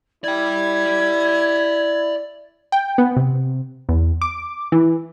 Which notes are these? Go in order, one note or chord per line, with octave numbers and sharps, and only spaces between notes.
E4 D5 G5 G#6
G5
B3
C3
E2
D6
E3